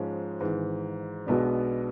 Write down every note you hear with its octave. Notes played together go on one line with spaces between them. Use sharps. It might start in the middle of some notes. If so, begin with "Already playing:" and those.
Already playing: G#2 F3 G#3 C#4
G#1 G#2 E3
B1 B2 G#3 B3 D4